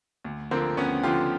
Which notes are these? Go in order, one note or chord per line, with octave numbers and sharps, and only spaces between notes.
D2
D3 F3 A#3 C4
D2 B3 C#4
D3 F3 F4 G4